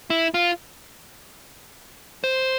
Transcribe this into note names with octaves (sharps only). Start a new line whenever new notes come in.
E4
F4
C5